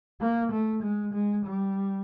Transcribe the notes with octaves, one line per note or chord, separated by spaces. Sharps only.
A#3
A3
G#3
G#3
G3